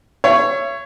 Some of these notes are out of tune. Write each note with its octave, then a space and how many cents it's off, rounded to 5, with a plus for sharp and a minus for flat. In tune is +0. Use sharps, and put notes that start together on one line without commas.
C#5 +0 E5 +40